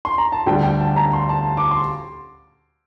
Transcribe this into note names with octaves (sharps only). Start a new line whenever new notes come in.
C6
A#5
A5
D2 D3 G3 G5
G5
A5
A#5
C6
A5
D6
C6